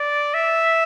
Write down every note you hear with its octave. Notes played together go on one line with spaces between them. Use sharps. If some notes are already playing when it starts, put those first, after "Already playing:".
Already playing: D5
E5